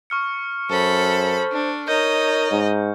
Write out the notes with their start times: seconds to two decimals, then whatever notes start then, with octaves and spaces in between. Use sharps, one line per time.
0.10 C#6 F6 C#7
0.70 F#2 A4 C5 B5
1.52 D4
1.88 D#4 A#4 C#5 D#5 G6
2.51 G#2